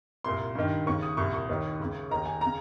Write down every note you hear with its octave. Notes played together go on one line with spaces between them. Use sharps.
C2 A#2 C6
G2 D#3
D#2 C#3 C#6
D#6
C2 A#2 C#6
C#6
D#2 D#3
C#2 C#3
D#2 D#3 A#5
G#5
C#3 A#5